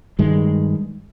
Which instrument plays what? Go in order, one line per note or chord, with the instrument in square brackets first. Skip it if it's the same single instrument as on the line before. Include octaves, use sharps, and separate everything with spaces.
[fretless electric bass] G2 D#3 G#3